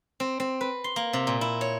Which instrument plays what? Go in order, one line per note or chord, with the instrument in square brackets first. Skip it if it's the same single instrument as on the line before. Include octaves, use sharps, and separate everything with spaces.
[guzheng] C4
C4
B4
C6
A#3
C3
A#2
E4
C#5